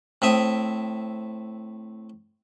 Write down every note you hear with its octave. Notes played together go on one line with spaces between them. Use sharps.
A2 C4 E5 D#6